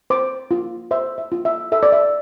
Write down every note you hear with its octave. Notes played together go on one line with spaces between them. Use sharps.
C5 D6
F4
C5 E5
E5
F4
E5
A4 E5
D5
E5